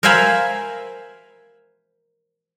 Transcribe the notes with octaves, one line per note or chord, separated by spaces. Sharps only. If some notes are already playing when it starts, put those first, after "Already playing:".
A#4 C5 E5 F5 G#5 B5